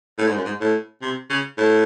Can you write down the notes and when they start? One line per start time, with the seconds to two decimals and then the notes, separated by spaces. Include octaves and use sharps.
0.18 A2
0.28 G#2
0.36 F#2
0.45 G#2
0.60 A2
1.02 C3
1.30 C#3
1.58 A2